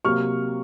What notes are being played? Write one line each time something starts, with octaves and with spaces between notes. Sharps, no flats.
C3 F#3 A#3 C#6 F6